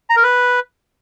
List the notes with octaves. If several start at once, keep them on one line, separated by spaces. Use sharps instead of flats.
A#5
A#4
B4